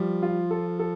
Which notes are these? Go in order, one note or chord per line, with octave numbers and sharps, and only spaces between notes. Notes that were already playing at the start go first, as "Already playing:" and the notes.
Already playing: F3 G3
F4
A4
A4